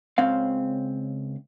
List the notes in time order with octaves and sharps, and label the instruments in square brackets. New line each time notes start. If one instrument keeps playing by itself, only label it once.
[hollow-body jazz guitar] C#2 C#3 C4 F5